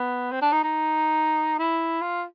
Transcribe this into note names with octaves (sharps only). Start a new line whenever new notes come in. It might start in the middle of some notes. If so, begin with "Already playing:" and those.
Already playing: B3
C4
D4
D#4
D#4
E4
F4